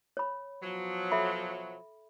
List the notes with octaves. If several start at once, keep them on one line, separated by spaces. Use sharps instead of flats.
C#5 B5
B2 F3 F#3
A4 E5 B5